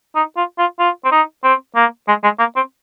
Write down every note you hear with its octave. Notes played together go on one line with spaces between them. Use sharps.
D#4
F4
F4
F4
C4
D#4
C4
A#3
G#3
G#3
A#3
C4